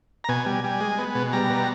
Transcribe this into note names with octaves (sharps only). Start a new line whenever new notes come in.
A#5
B2 G#5
G3
G3
G#3
B3
B2
G3 A#5
B2